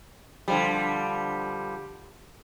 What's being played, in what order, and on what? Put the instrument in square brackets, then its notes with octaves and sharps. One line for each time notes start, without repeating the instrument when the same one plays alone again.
[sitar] D3 F3 G3